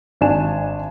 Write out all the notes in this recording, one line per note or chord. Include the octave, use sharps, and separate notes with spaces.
G#1 D4 G#5 E7